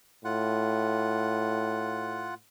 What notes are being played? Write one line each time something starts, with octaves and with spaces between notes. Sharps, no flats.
A2 F4 F#5